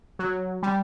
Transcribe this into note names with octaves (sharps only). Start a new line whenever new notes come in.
F#3
G3